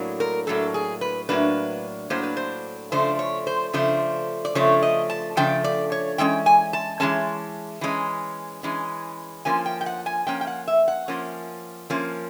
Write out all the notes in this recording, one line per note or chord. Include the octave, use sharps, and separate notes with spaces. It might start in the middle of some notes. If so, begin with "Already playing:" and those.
Already playing: A2 F#3 A#3 D4
A#4
A2 F#3 A#3 D4 A4
G#4
B4
A2 F#3 A#3 D4 B4
A2 F#3 A#3 D4 C5
B4
C5
C#3 F3 A3 D4 C5
C#5
C5
C#3 F3 A3 D4 C5
D5
C#3 F3 A3 D4 C#5
D#5
A5
C#3 F3 A3 D4 G5
D5
C#5
E3 G#3 C#4 G5
G#5
A5
E3 G#3 C#4 A5
E3 G#3 C#4
E3 G#3 C#4
F3 A#3 C#4 G#5
G5
G5
F#5
G#5
F3 A#3 C#4 G5
G5
F#5
E5
F#5
F3 A#3 C#4
F3 A#3 C#4